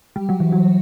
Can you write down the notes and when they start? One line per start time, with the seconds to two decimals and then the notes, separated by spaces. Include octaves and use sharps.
0.16 G3
0.29 F#3
0.40 E3
0.52 F#3